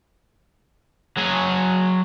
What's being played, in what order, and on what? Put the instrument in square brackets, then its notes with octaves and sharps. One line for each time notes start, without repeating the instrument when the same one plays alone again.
[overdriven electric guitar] F#3 G#4